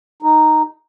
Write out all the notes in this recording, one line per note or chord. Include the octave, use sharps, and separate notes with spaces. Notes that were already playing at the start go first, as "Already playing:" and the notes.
D#4